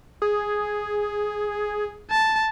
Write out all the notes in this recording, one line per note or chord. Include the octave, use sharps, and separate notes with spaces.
G#4
A5